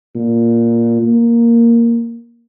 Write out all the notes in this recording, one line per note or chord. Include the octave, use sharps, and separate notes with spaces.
A#2
A#3